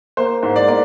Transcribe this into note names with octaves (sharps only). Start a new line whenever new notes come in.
A#3 C5
G#2 C5
D5
A#3 D5